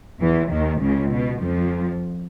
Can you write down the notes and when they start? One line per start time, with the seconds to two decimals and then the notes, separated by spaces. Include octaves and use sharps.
0.20 E2 E3
0.51 D#2 D#3
0.81 C#2 C#3
1.11 B2
1.41 F2 F3